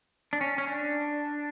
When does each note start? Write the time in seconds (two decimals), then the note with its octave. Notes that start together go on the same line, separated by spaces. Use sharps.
0.33 D4
0.41 C#4
0.58 C#4
0.68 D4